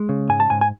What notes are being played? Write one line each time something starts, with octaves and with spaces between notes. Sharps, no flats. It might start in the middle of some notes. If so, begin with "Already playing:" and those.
Already playing: G#3
C#3
G#2 G#5
A5
G#2 G#5
G#5